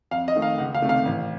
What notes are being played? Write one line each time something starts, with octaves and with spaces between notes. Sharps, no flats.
F2 F5
D#5
D#3 A3
F5
C#2 F#5
F5
C3 D#3 A3
F5
A1